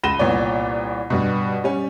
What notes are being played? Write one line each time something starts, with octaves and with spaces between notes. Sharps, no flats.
C#2 B5 A#6 D#7 E7 G7
C2 A#2 B3 C#5 D5
G2 B2
G3 C#4